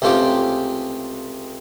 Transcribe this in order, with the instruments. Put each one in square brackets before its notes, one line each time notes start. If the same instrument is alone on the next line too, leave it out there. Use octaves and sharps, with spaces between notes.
[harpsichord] C#2 C3 A3 F4 G4 D6